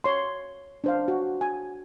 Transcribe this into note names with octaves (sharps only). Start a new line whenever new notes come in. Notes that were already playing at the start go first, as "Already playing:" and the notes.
C#5 C6
D4 C5 F5
F#4
G#5